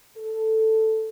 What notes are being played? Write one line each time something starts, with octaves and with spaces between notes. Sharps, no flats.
A4